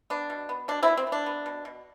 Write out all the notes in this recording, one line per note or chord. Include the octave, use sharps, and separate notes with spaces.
B3 D4
B2
B3
B2 D4
C4 E4
B3
C4
B3
D4
B3
B2
B2